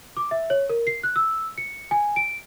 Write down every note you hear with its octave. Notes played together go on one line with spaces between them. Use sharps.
D6
E5
C#5
A#4
C7
F#6
E6
C#7
G#5
D7